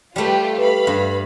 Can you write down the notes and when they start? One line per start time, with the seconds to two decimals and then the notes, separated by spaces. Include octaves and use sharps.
0.16 G3 A3 F4 G4 B4
0.58 B4 F5 B5
0.87 G2